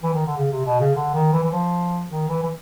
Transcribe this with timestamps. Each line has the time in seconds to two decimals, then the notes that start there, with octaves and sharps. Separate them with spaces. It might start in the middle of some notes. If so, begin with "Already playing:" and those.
0.03 E3
0.14 D#3
0.26 D3
0.37 C#3
0.51 C3
0.65 B2
0.80 C#3
0.95 D3
1.14 D#3
1.33 E3
1.43 E3
1.52 F3
2.10 D#3
2.29 E3
2.43 E3